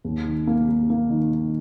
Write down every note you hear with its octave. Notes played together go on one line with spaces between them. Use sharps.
D#2
D#3
A#3
A#3
A#3
D#3
D#3